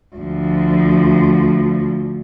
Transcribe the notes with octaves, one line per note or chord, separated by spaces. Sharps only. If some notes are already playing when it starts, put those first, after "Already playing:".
D2 F3